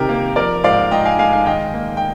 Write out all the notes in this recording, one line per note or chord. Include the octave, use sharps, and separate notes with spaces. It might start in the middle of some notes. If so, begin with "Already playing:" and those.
Already playing: C3 D#3 D#4 G4 A#4
A#3
F3 A#4 D5
G#2 D5 F5
G#2 D#5 G5
F5 G#5
G#3 F5 G#5
F5 G#5
D#3 D#5 G5
A#3
G5